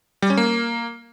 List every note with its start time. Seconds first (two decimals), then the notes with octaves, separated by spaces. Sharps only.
0.22 G3
0.30 C#4
0.37 A#3